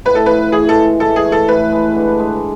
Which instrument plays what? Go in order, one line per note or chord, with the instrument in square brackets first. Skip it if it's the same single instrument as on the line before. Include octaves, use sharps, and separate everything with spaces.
[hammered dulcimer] A2 [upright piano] B4
[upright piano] A4
[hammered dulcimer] F3 [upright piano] B4
[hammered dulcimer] E3 [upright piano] G#4
[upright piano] A4
[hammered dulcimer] G#3
[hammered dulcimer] E3 [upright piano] A4
[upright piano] G#4
[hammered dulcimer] A3
[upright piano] A4
[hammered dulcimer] A2 [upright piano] B4
[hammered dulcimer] G#3
D3
G#3